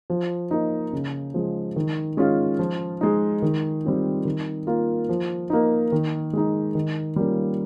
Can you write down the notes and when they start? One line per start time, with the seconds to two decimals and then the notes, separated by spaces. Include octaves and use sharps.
0.10 F3
0.51 A#3 D#4
0.93 C#3
1.34 F3 G#3
1.76 D#3
2.17 G#3 C#4 F4
2.59 F3
3.01 G#3 D#4
3.42 D#3
3.84 G3 C4 F4
4.25 D#3
4.67 A#3 F4
5.09 F3
5.50 A#3 D#4
5.92 D#3
6.33 G#3 D#4
6.75 D#3
7.16 G3 A#3 C#4 F4